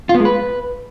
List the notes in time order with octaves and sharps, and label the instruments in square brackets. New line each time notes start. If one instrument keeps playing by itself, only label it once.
[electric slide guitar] F4
B3
G#3
B4